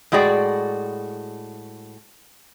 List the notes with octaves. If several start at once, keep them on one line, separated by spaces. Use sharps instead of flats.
A2 G#3 F#4 G#4 D5 G5